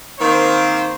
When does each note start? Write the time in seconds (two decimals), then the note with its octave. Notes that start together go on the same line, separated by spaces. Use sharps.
0.19 D#3 A#3 C4 C5